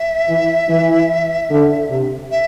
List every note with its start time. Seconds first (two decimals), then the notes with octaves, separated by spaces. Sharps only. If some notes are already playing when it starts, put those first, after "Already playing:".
Already playing: E5
0.28 E3
0.69 E3
1.50 D3
1.90 C3
2.31 E5